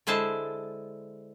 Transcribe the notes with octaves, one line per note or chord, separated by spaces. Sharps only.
D3 G#3 E4 C5 A5